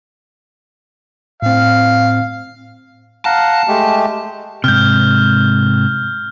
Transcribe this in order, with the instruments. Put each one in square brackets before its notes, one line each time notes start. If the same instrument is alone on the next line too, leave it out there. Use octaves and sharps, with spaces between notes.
[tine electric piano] A2 C4 [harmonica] F5
[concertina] F5 F#5 A#5 [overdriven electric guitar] A5
[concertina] G#3 A3 G4
[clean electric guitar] G#2 C3 [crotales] F6 G6